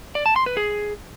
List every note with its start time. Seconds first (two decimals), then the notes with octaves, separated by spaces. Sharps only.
0.15 D5
0.26 A5
0.36 C6
0.46 B4
0.57 G#4